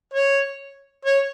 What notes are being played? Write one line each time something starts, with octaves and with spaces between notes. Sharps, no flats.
C#5
C#5